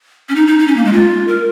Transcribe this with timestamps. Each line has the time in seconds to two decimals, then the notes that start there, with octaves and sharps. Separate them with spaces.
0.29 C#4
0.36 D#4
0.47 D#4
0.59 D#4
0.68 C#4
0.76 A#3
0.85 G#3
0.93 F4
1.28 A#4